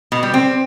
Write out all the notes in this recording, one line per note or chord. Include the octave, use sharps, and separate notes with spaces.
B2
G3
C4